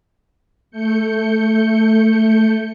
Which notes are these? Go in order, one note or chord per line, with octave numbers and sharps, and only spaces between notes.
A3 G6 C#7